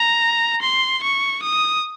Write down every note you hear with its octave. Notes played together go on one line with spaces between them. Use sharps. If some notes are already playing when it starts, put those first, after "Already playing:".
Already playing: A#5
C6
C#6
D#6